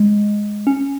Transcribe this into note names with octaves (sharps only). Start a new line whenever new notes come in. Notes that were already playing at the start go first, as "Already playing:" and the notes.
Already playing: G#3
C#4